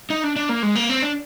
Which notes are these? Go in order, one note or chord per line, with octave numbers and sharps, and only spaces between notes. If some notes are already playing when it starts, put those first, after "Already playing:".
D#4
D4
D4
A#3
G#3
A#3
C4
D4